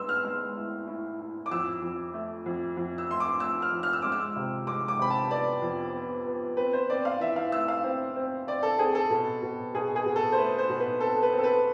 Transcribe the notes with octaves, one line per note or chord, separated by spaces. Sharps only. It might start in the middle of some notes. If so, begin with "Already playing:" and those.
Already playing: G#3 B3 C6 E6
F6
G#3
A2
A2
A2
D6
F2 E6
F2
A3
F2
F2
E6
A3 C6
D6
A3 E6
F6
F2
F6
E6
G#3 D6
E6
C3
G#3 D6
D6
C3 B5
A5
B3 D5
F2
B3
B3
C4 B4
C5
C4 D5
F5
E3 E5
F5
A3 E6
F5
C4
C4
C4 D5
A4
C4 G#4
A4
B2
B2
B2 G#4
G#4
B2
A4
C5
A3 B4
C5
B2
B4
C4 A4
B4
C4
A4
B4